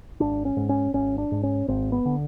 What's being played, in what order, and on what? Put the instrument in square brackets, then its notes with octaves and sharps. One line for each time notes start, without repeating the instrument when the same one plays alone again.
[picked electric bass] G#1 D4
C#4
G#2
C#4
G#1 C#4
D4
G#2
C#4
G#1 C4
B3
D3